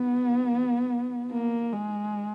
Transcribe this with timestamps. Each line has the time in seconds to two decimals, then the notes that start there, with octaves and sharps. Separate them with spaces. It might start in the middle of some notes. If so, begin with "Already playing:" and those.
Already playing: B3
1.32 A#3
1.73 G#3